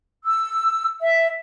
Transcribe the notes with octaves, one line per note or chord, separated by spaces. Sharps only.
E6
E5